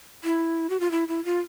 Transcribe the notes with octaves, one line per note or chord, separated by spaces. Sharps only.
E4
F#4
F4
E4
E4
F4